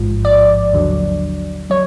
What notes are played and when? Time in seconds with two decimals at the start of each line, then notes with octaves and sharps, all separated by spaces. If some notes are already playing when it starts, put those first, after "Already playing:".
Already playing: A1 G#2 F3
0.25 D5
0.73 D#2 D3 F#3
1.70 F#3 C#5